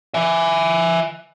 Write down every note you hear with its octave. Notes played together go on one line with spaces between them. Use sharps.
E5 G#5